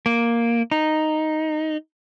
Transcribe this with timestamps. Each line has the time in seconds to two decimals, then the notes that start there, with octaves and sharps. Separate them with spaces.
0.06 A#3
0.71 D#4